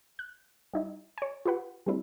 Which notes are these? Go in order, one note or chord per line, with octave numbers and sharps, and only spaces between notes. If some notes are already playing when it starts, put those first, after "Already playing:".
F#6
G3 D#4 E4
C#5 G#5
F4 G4 B4 F#5
G3 A3 C4 D4 E4